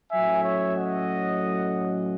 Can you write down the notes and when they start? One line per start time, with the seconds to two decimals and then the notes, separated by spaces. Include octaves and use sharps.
0.11 A2 F#3 C#4 E5 G#5
0.42 C#5 E5
0.74 D#5 F#5